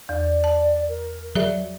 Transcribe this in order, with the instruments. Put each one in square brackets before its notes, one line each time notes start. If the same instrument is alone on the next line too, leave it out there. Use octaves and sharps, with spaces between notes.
[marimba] E2 [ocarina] D5
[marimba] A5
[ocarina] A#4
[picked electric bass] F#3 [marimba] G#4 D5 E5